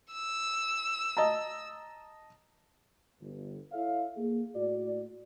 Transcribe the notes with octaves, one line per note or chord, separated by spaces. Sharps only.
E6
D#5 A5 A#5
G1
E4 A4 C#5 E5 F5
A#3 G#4
A2 F#4 D5